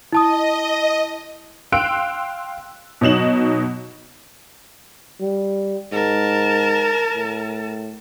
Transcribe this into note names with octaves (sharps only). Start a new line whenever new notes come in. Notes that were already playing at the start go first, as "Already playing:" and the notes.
E4 D#5 A5 D#6
F5 G5 C6 E6 F#6 D7
B2 F#3 D#4 E7 F#7
G3
G#2 A#4 A5
A2